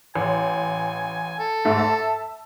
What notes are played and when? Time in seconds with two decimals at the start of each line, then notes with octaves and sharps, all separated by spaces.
0.15 A1 G#5
1.39 A4
1.65 G#2 A3 E6
1.79 E5 A5